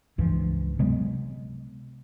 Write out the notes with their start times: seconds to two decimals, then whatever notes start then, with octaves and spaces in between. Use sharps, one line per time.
0.18 C#2 G2 E3 F3
0.79 C3 F#3 G#3 B3